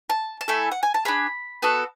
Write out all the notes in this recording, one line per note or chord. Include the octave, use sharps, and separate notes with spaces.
A5
A5
A3 E4 A4 G#5
F#5
G#5
A5
D4 G#4 B5
B3 F#4 A4